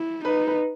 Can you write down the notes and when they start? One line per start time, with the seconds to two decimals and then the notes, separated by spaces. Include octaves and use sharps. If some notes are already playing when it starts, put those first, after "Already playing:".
Already playing: E4
0.25 D#4 B4
0.47 B4